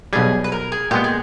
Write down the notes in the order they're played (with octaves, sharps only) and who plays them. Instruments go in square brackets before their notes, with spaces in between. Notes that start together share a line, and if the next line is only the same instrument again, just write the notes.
[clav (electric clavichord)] B1 B2 G3 [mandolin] G#4
[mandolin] B4
A#4
G#4
[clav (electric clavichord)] A#2 G#3 B3 [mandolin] G4
[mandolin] G#4